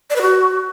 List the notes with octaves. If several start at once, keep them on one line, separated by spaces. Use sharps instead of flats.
D5
B4
F#4